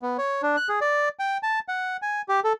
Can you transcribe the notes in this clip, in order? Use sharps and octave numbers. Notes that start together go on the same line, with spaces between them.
B3
C#5
D4
F#6
G#4
D5
G5
A5
F#5
G#5
G4
A4